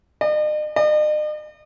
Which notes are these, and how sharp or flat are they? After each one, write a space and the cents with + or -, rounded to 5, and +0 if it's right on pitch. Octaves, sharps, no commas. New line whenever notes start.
D#5 -45
D#5 -45